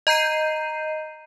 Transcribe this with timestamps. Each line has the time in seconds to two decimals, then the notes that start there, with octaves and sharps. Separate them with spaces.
0.07 D#5 A#5 G6 C7 D#7